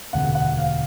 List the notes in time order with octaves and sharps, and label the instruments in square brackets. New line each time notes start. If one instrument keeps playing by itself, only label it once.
[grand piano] E1 D2 C3 [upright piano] F#5
[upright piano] F#5
F5